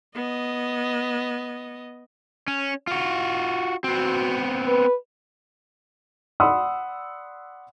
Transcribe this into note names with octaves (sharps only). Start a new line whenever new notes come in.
B3 D#5
C#4
F4 F#4
B3 C4 F#4
B4
D5 F#5 B5 C6 D#6 E6